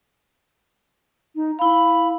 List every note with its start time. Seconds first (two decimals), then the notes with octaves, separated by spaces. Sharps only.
1.36 D#4
1.59 E4 F5 B5